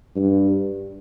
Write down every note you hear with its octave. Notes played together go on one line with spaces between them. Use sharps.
G2